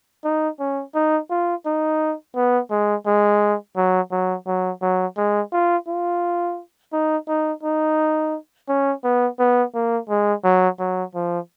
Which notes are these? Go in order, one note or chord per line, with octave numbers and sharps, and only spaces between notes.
D#4
C#4
D#4
F4
D#4
B3
G#3
G#3
F#3
F#3
F#3
F#3
G#3
F4
F4
D#4
D#4
D#4
C#4
B3
B3
A#3
G#3
F#3
F#3
F3